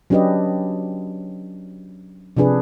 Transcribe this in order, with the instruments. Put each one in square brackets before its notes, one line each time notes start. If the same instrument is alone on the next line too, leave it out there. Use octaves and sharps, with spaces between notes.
[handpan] F#3 C#4 D4 G4 B4 D#5
C3 F3 D4 G#4 B4